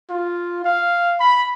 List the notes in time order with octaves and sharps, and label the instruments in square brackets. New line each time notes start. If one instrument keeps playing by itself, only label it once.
[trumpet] F4
F5
B5